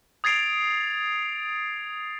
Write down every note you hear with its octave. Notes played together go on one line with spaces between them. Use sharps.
D#6 G#6 A6 C7 D7 F7